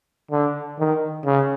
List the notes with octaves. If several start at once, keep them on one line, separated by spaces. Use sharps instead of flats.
D3
D#3
C#3